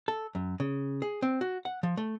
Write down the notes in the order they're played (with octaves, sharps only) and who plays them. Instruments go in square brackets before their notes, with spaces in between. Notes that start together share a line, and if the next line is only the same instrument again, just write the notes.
[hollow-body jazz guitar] A4
F#2
C#3
G#4
C4
F#4
F#5
F3
A3